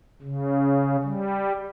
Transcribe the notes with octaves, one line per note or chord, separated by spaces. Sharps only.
C#3
G3